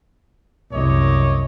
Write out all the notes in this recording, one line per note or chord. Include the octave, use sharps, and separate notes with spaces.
C2 F#2 C#5 D#5 D6